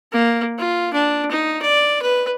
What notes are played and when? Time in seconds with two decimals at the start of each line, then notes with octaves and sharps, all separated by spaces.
0.12 A#3
0.58 F4
0.93 D4
1.31 D#4
1.62 D5
2.02 B4